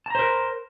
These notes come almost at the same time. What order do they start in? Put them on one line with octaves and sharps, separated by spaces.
A5 A#5 C5 A#4